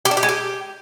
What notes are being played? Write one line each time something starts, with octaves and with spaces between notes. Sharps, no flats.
G4
D4
G4
G#3
G4